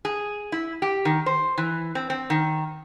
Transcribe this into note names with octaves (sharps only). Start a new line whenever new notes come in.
G#4
E4
G4
D#3
C5
E3
C4
C4
D#3